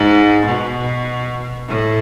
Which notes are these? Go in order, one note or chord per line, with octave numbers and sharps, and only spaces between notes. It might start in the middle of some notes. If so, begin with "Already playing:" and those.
Already playing: G#2
B2
A2